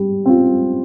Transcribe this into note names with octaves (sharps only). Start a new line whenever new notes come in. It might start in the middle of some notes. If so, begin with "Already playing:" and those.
Already playing: G3
C4 F4